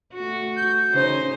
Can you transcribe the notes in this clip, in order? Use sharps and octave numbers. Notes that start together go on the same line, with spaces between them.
A3 F#4
G6
C#3 D#4 C5